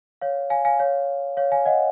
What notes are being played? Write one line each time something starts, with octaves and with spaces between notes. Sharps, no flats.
C#5 F5
F5 G#5
F5 G#5
C#5 F5
C#5 F5
F5 G#5
D#5 F#5